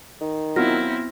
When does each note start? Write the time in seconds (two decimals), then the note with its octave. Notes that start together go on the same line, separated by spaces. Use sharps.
0.21 D#3
0.56 F#3 B3 C4 E4 F4 F6 A#6